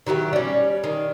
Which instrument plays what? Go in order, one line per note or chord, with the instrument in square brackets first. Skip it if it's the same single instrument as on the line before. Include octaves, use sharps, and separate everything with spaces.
[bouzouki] D#3 F#3 E4 G4
G3 C#4
D#3